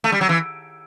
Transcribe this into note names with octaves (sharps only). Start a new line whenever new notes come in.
A3
G3
F#3
E3